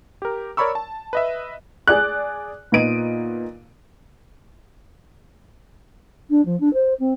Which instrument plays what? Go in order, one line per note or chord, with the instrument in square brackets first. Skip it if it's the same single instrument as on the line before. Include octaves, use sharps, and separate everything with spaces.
[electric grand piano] G4 A#4
A#4 C#5 D5 B5 C#6 E6
A5
B4 D#5 E5
[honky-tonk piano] G#4 D5 F#6
A#2 B3 D#4 D7 D#7
[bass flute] D4
F3
D4
C5
C4